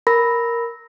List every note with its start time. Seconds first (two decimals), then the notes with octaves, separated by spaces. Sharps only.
0.07 A#4 B5 A#6